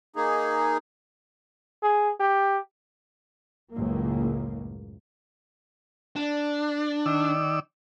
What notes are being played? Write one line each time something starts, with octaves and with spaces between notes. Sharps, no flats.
A#3 D#4 G#4
G#4
G4
F#1 C#2 A2 A#3
D4
D#3 D5 E6